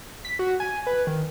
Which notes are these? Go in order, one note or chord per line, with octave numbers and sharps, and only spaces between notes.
B6
F#4
G#5
B4
D#3